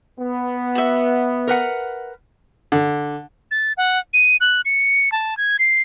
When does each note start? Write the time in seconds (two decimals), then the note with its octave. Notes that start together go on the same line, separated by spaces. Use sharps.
0.19 B3
0.75 F#4 E5
1.47 A#4 B4 F#5
2.72 D3
3.51 A6
3.77 F#5
4.13 D#7
4.40 F#6
4.65 C#7
5.12 A5
5.37 G#6
5.59 C7